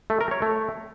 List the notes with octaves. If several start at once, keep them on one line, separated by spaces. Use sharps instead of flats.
A3
A#4
C#5
A3